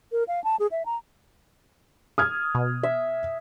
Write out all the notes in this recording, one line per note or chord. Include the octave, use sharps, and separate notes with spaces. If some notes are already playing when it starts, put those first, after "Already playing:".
A#4
F5
A5
G#4
E5
A#5
D#6 F6 G#6
B2
E5